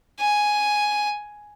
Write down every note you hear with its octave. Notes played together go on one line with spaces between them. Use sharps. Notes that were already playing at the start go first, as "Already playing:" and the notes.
G#5